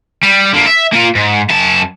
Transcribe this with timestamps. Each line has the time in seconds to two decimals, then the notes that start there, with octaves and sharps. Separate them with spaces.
0.23 G3
0.54 D3 A#3
0.66 E5
0.93 A#3 F4
1.15 G#2
1.50 F#2 A5